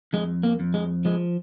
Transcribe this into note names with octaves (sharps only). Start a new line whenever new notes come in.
F2 G#3
A#3
F2
G#3
F3 G#3